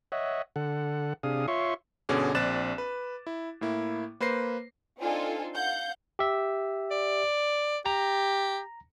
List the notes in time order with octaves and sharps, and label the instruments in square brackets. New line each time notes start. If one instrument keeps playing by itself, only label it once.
[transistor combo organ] C#5 D#5 E5 F#5
D3 A4 F#5
C3 D4 G#4 F5 D#6
F4 C#5 E5 C6 C#6
[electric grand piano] G1 B2 D3 C#4 G#4 D6
A#1 C4 D5 F#6 A6 E7
B4
E4
A2 A#3 E4
A#3 B4 C5 A#6 C7
[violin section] C4 D4 D#4 F4 A4 G#5
F5 F#5 G6
[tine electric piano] G4 E5
[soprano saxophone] D5
[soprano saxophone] G4 [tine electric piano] A#5 A#6